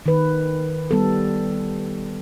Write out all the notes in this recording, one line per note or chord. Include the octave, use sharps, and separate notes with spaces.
D#3 B4
G3 B3 A4